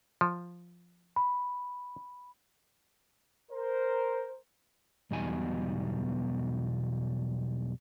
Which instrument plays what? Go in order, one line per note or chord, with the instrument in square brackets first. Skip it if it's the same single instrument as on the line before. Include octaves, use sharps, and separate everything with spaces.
[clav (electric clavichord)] F3
[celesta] B5
[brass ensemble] A#4 C5
[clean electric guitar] B1 E2 B2 G3 D#4 G#5